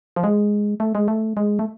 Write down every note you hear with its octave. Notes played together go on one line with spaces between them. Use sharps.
F3
G#3
A3
G#3
A3
G#3
A3